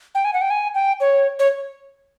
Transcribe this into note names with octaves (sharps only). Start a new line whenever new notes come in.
G5
G#5
F#5
G5
G#5
G5
C#5
C#5